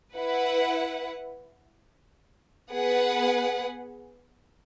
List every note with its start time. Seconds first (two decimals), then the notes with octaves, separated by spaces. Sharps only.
0.15 E4 B4 F#5
2.72 B3 G#4 B4 F#5